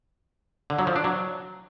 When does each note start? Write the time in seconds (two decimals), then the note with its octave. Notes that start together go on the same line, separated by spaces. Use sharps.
0.70 D3
0.79 F#3
0.87 F3
0.96 D4
1.04 F#3